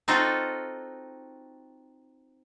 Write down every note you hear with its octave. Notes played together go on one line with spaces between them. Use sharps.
C4 D#4 F4 F#4 A4